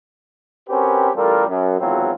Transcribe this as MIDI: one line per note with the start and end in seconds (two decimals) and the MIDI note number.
0.69 1.10 60
0.69 1.10 61
0.69 1.10 66
0.69 1.10 67
0.69 1.10 70
0.69 1.10 71
1.15 1.46 33
1.15 1.46 55
1.15 1.46 65
1.15 1.46 69
1.15 1.46 70
1.47 1.76 42
1.79 2.12 32
1.79 2.12 40
1.79 2.12 52
1.79 2.12 54
1.79 2.12 60
1.79 2.12 65